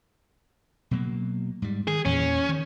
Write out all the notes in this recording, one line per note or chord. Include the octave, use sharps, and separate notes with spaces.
B2 F#3 A#3
G#2 G3
D#3 G#4
E2 A#2 E3 C#4
D#3